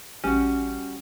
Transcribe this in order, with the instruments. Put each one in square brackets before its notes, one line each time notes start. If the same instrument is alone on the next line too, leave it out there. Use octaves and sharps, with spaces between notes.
[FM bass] A1 [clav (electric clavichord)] G3 F#4 [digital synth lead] C#4